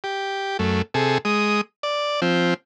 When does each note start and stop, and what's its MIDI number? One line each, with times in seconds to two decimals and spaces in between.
0.04 0.57 67
0.59 0.82 42
0.59 0.82 57
0.94 1.18 48
0.94 1.18 68
0.94 1.18 69
1.25 1.61 56
1.25 1.61 87
1.83 2.20 74
2.22 2.54 53
2.22 2.54 60